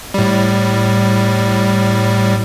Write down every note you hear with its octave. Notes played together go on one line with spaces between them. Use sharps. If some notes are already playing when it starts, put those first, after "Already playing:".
A2 G3